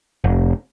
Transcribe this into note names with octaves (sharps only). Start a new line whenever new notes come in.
F1